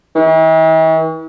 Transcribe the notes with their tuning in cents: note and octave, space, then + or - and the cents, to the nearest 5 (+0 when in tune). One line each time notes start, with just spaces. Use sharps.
E3 -45